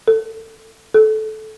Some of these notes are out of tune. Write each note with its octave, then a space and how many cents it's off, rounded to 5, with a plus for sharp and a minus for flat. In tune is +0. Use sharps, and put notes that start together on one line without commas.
A4 +20
A4 -20